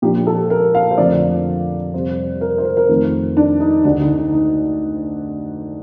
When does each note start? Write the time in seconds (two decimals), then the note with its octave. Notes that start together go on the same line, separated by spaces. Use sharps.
0.02 A#2 F3 A#3 D4 G4
0.27 A4
0.50 A#4
0.75 F5
0.91 C5
0.98 F2 D3 F3 A3 D5
1.94 F2 C3 G3 C5
2.41 A#4
2.58 C5
2.65 A#4
2.77 A#4
2.89 F2 D#3 A3
3.37 D4
3.60 D#4
3.84 D2 D3 A3 D4
4.00 D#4
4.16 D#4
4.33 D#4